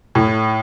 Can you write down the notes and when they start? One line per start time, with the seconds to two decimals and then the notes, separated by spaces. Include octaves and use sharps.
0.15 A2